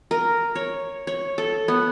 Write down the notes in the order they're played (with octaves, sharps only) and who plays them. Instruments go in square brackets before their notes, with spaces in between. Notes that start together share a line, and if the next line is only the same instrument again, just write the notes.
[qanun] A#4
C#5
C#5
A4
B3